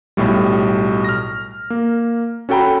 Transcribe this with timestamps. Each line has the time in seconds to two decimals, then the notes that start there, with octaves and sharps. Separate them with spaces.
0.17 B1 A2 G3
1.04 F6 A#6
1.70 A#3
2.49 C#4 F#4 A4 G5 A#5 B5